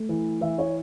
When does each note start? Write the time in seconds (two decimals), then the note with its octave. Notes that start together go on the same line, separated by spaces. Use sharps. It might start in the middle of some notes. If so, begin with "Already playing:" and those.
Already playing: A3
0.09 E3
0.41 E3 E5
0.58 C#5